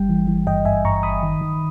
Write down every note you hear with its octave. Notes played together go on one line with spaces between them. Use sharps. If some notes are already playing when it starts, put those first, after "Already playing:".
Already playing: G1 G3 G5
E3
E3
G2 D#5 G5
G2 E5 G#5
G2 A#5 C#6
G1 B5 D#6
D#3
D#3